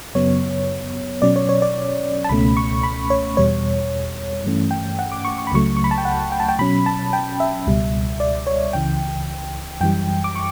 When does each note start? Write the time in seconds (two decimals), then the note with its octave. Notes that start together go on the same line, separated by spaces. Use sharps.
0.15 F#2 C#3 F#3 B3 C#5
1.22 B2 F#3 C#4 D5
1.36 C#5
1.49 C#5
1.62 D5
2.24 A5
2.29 C#2 B2 A3 C#4 B5
2.57 C#6
2.83 B5
3.10 C#5
3.37 E2 B2 G3 C#5
4.44 G2 E3 A3 C#4
4.71 G5
4.99 F#5
5.12 D6
5.25 C#6
5.38 C#6
5.47 B5
5.52 C#2 C#3 F#3 A3 C#6
5.77 C#6
5.84 B5
5.91 A5
5.98 G5
6.05 F#5
6.32 G5
6.40 A5
6.49 G5
6.59 B2 F#3 C#4 B5
6.86 A5
7.13 G5
7.40 E5
7.67 C#2 B2 G3
8.20 D5
8.47 C#5
8.73 C#2 C#3 E3 G5
9.81 F#2 E3 G3 G5
10.24 D6
10.36 C#6